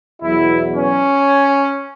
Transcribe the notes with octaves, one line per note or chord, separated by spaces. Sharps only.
E2 B2 F#3 E4
C#4